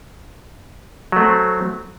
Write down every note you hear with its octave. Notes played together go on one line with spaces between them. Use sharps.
F#3 A3 C4